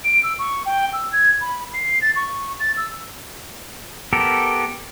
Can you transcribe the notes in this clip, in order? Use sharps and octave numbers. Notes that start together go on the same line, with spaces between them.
D7
E6
C#6
G5
E6
G#6
B5
C7
A6
C#6
A6
E6
B3 G4 A4 A#4